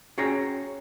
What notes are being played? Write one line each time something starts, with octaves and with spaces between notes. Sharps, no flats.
C#4 F#4 G#4 C#5 G5 A#5